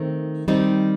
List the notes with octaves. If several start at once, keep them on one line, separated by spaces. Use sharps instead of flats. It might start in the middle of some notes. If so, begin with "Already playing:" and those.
Already playing: D#3 A3 C4
D#3 G3 C4 D#4